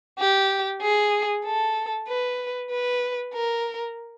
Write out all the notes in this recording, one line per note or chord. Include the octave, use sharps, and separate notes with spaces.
G4
G#4
A4
B4
B4
A#4